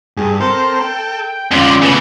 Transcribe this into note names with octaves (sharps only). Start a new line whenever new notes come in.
G2 G#4
C4 A4 A#4 C5
G5
F2 D3 C#4 F4 D5 C6
C#3 E3 A3 B3 E6